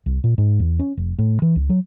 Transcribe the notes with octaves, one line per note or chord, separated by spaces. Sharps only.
C2
A#2
G#2
E2
C#4
F1
A2
E3
C#2
F#3